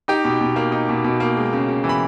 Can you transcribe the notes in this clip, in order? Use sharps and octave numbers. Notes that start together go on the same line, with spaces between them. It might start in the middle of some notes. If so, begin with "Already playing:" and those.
D#4 G4 G5
B2
B2
A#3
D#4
B2
B2
A#3
G#3
C#3
C#3
E3
B5